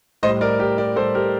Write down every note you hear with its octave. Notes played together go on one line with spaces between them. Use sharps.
A2 G3 C5 D#5
A#4 D5
G4 A#4
A#4 D5
A2 G3 A4 C5
G4 A#4